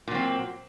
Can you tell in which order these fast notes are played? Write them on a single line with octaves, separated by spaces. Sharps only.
A#2 F#3 C4